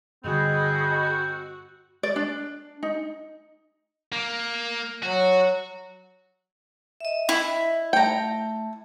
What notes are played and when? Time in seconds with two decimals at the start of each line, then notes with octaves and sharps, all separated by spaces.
0.24 G2 D3 C4 F#4 G#4 D#5 B5
2.03 D5
2.16 D4
2.83 D#4
4.12 A#3
5.03 F#3 F#4
7.00 D#5 E5
7.29 E4
7.93 A3 G5 A5 A#5